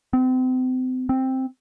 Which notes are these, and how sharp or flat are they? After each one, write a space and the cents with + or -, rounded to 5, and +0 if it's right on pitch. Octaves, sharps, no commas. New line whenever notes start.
C4 -35
C4 +5